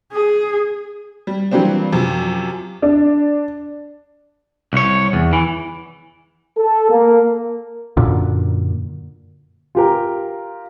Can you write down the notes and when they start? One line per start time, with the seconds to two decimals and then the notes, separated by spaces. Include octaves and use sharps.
0.13 G#4
1.27 G3
1.51 E3 F#3 G3 A#3 C4 D4
1.92 F#2 C3 F3
2.82 D4
4.73 C2 C#5
5.13 E2
5.33 E3
6.58 A4
6.90 A#3
7.97 F#2 A#2 D3
9.75 F4 G4 A#4